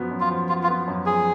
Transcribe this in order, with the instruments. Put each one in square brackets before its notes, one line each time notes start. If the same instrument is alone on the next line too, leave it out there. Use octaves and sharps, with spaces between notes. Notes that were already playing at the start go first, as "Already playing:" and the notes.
Already playing: [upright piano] F#2 F3 B3 F#4
F#2
[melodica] F4
[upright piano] F3
[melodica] F4 [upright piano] F#4
[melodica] F4
[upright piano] B3
F#2
[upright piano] F3 [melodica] G#4